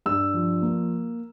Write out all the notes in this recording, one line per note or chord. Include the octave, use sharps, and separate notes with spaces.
G2 E6
F3
A#3